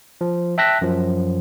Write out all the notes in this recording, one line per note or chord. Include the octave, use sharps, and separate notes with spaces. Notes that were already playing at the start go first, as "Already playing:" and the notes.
F3
E5 G5 A5 F#6 A#6 B6
F#2 F3